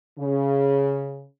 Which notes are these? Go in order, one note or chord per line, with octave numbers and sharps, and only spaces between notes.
C#3